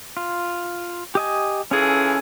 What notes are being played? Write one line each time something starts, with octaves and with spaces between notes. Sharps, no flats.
F4
G4 D#5 G#5
E3 C#4 F4 G#4 A4